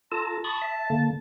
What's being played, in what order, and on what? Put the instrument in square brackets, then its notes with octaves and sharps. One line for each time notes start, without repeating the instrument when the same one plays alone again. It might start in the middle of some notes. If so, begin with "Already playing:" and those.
[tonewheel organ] F4 A4 A5 [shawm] A#5
[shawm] A5 [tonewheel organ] B5 C#6 D#6
[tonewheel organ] E5
D3 A#3